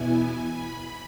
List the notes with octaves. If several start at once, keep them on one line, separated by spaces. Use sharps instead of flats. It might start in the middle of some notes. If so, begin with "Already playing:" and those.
Already playing: E2 B2 B3 E4 G#5
B5